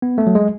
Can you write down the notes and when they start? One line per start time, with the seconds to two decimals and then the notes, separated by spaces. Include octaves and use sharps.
0.02 B3
0.18 A3
0.27 F#3
0.35 G#3